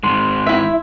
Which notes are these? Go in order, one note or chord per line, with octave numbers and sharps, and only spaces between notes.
G#2 D#3 G#3 C6
E4 E5